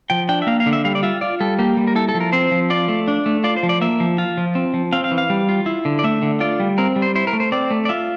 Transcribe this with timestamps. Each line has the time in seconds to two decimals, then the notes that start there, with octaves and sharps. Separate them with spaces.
0.10 F3 G5
0.29 D4 G5
0.42 E5
0.47 A#3 F5
0.60 F5
0.66 D3
0.73 E5
0.85 G3 F5
0.95 D5
1.03 F4 E5
1.21 F4 D5
1.40 G3 A4
1.59 A#3 G4
1.77 G3
1.87 A#4
1.96 E4 A4
2.09 A4
2.14 F3
2.20 A#4
2.33 C4 C5
2.51 F3
2.70 F4 D5
2.88 A3
3.08 D4
3.26 A3
3.44 F4 D5
3.56 C5
3.63 F3
3.69 D5
3.81 A#3 E5
4.00 F3
4.18 F4
4.37 F3
4.55 C4
4.74 F3
4.93 C4 F5
5.04 F5
5.11 E3
5.18 F5
5.30 G3
5.49 F4
5.66 E4
5.85 D3
5.99 D5
6.04 A3 E5
6.22 D3
6.40 F4 D5
6.60 G3
6.78 C4 A#4
6.96 G3
7.02 C5
7.15 E4 C5
7.27 A#4
7.33 A3
7.40 C5
7.52 C4 D5
7.71 A3
7.85 D5
7.89 F4 E5